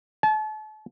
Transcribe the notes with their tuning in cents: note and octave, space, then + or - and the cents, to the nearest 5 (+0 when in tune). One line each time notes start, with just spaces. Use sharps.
A5 -35